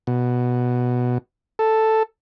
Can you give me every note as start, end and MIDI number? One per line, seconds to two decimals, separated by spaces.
0.07 1.18 47
1.59 2.03 69